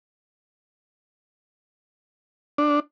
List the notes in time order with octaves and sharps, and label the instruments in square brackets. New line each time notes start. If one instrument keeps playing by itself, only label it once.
[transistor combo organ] D4